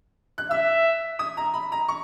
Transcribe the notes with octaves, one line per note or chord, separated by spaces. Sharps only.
F#6
E5 E6
D#6
A#5
B5
A#5
C#6